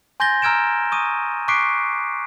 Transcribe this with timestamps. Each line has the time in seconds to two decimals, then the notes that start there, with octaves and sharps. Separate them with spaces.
0.20 G#5 C6 G6 A6 A#6 G7
0.42 A#5 E6 F6 G#6 D7 E7
0.92 C#6 D#6 D#7
1.48 C#6 D6 F#6 B6 C7 D7